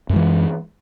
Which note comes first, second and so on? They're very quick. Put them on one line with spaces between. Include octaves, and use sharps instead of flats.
F#2 G#3 E3